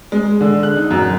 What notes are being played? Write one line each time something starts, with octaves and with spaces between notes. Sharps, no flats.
G#3
D3
F#6
D#4
F#2